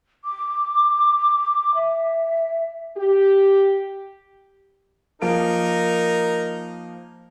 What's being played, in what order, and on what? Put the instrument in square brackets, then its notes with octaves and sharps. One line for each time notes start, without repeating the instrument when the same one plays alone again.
[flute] D6
E5
[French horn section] G4
[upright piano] F3 A#3 D7 [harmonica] D#4 A#4